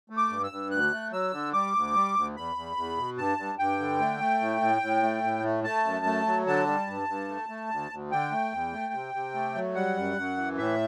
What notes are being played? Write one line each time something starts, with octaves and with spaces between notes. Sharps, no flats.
A3
D6
G2
E6
G2
D2 F#6
A3
F#3 E6
D3
G3 D6
D2
G3
D2
E2 B5
E2
E2
B2
G2 A5
G2
G2 G5
D3
A3
A3
A2
A2
A2
A3
A2
A3
A3 A5
F#2
A3
F#3
D3 A5
G3
G2
G2
A3
A3
D2
D2
D3 G5
A3
E2
A3
C3
C3
A3
F#3
G3 F#5
F#2
F#2
E3
A2 E5